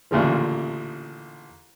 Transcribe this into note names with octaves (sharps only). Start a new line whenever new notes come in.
A1 D2 A#2 C#3 F3